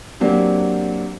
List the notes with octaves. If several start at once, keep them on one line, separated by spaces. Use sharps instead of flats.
F#3 A#3 C4 D4 G4